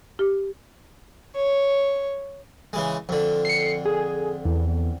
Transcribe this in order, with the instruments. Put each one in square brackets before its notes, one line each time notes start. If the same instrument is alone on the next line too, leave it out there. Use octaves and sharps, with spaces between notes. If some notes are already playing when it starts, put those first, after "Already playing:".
[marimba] G4
[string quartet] C#5
[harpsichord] C#3 E3 G#3
F2 D3
[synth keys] C7 C#7
G#4
E2